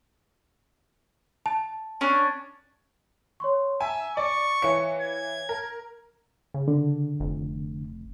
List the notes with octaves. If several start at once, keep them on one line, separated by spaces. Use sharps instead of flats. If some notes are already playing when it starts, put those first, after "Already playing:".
A5
C#4 D4
C#5 C6 C#6
E5 G#5 A#5
D5 C#6 D6
E3 C#5 F5 C#7
G#6
A#4
C#3
D3
F1